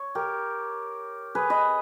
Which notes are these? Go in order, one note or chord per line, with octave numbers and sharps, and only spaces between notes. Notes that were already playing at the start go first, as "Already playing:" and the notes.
Already playing: C#5
G4 A#4
G#4 B4
B4 D#5